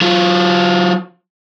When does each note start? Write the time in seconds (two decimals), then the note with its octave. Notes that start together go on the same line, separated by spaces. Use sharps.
0.01 F#3 F4